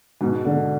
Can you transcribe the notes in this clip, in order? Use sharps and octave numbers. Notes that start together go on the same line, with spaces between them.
G#2 B2
B2 D3